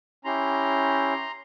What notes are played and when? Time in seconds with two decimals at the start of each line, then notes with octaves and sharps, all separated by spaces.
0.25 C#4 E4 G4 A#5 C6